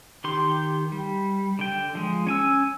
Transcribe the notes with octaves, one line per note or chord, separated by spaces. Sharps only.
D#3 G4 C6
G3
D3 G5
F3 G#3
C#4 G#5 E6